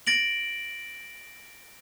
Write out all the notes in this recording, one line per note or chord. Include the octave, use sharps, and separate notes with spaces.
A6 A#6 D7 F#7